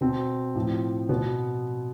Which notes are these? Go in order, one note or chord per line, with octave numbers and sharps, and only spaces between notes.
B2 C4
A2 F3
B2 B3